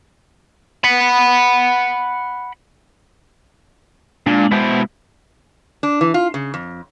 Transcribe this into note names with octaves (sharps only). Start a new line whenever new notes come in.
F#5 B5
A#2 G#3 D4
B2 B3 E4 C5 B5
D4
E3
F4
C#3
F2